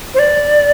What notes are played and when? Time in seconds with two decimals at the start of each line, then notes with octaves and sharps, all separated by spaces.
0.14 C5
0.19 D5